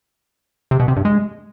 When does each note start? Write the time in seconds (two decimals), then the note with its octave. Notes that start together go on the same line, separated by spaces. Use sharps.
0.71 C3
0.80 B2
0.88 C3
0.96 G2
1.05 G#3